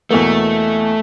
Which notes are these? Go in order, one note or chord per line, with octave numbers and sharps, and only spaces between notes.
E2 B2 A3 A#3